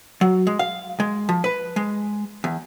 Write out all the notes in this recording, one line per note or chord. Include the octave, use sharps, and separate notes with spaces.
F#3
G#3
F5
G#3
F3
B4
G#3
E2